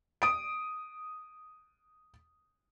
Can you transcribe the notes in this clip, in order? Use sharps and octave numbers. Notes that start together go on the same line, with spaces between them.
D#6 D7